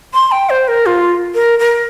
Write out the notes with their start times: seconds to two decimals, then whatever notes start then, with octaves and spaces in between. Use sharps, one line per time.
0.14 C6
0.32 G5
0.50 C5
0.68 A#4
0.86 F4
1.35 A#4
1.59 A#4